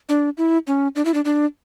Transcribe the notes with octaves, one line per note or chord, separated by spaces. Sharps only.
D4
E4
C#4
D4
E4
D4
D4